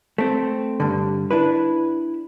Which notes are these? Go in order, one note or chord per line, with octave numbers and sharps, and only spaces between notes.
A3 C4
G2 D3
D4 E4 B4